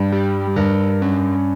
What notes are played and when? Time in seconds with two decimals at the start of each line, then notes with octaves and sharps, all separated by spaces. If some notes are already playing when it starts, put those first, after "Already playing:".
Already playing: G2 G3
0.12 G4
0.56 G2 A#4
1.02 C#4